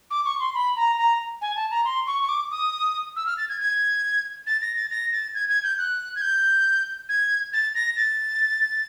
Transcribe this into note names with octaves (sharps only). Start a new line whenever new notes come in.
D6
C#6
C6
B5
A#5
A#5
G#5
A5
A#5
C6
C#6
C#6
D6
D#6
E6
F6
A6
G#6
G#6
A6
A#6
A6
A#6
A6
G#6
G#6
G6
F#6
G#6
G6
G#6
A6
A#6
A6